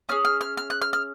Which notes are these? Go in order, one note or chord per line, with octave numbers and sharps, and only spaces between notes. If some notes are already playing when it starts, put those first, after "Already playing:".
C#4 G#4 F6
F6
F6
F6
F#6
F6
F6